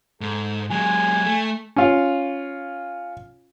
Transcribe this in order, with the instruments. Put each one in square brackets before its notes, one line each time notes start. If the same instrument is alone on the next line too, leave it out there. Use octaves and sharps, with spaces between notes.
[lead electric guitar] G#2 [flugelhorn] A4
[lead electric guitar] F#3 G#3 [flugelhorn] G#5
[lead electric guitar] A3
[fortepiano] C#4 F4 F5